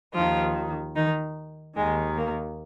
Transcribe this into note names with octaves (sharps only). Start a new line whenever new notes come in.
D#2 D#3 F3 F4
D#3 D#4
D#2 D#3 G#3
A#3